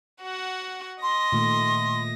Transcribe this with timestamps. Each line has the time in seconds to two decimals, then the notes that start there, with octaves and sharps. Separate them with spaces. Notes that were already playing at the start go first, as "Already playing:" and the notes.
0.22 F#4 F#5
1.03 D#5 C6 A#6
1.33 A#2 D#3 A3